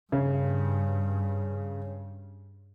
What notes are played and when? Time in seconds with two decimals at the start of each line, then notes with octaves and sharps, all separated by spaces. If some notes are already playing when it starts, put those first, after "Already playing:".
0.12 G2 C#3